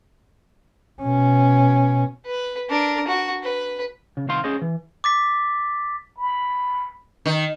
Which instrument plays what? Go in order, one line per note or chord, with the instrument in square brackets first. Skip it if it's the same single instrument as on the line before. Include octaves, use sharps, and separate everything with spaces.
[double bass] B2 C#4
[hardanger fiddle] B4
D4 A#4
F#4
B4
[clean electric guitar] C#3
C2 D#3 C4 C5 F5 C6
C#4 G#4 C5 D#5
E3
[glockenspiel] D6 A6 B6
[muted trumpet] B5
[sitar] D#3